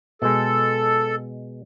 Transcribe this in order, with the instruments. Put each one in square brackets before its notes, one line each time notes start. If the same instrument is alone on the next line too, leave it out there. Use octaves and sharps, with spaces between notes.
[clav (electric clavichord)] B2 G#3 [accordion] A4